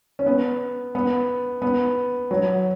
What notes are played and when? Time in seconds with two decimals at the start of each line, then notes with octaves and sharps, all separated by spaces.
0.19 C#4
0.26 B3
0.95 B3
1.62 B3
2.31 F#3